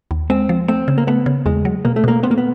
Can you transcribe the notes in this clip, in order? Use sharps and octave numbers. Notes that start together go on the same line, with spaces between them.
D#2
G#3 C4
F3
A3 C4
C#3
A#3
A3 B3
C#3
E2 G#3
F#3
B2 A#3
A3
B2 A#3
B3 C4
A#3
B3